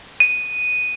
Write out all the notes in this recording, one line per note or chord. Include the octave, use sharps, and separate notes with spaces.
D#7